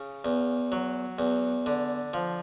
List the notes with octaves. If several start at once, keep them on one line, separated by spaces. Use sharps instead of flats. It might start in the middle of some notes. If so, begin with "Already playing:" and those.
Already playing: C#3
E2
F#3
E2
D3
F3